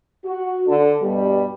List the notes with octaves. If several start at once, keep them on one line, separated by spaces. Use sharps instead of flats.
F#4
D3
G2 B2 G3